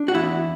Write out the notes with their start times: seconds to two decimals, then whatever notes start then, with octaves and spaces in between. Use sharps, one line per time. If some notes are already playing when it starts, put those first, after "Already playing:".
Already playing: D4
0.08 F#4
0.15 E2 E4